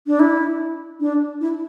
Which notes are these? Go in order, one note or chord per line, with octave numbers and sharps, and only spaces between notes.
D4
E4
D4
E4